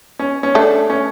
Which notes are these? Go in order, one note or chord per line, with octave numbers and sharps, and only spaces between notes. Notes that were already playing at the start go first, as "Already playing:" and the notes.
C#4
C#4
A3 D4
C#4